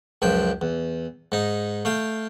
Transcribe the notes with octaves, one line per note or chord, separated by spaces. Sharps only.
C#2 F#2 F3 G5
E2
G#2 D#4
A3 F5 G5